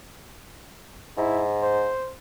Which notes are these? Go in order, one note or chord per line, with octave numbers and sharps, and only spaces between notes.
G#2 E4
C5